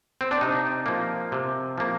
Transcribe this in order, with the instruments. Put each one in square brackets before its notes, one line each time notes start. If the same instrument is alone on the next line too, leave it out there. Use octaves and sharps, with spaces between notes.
[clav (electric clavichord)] C4
D4
C3 D#4
F3 A#3
C3
F3 A#3